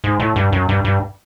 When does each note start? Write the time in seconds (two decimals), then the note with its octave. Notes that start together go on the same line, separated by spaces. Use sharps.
0.04 G#2
0.20 A2
0.36 G2
0.52 F#2
0.69 G2
0.85 G2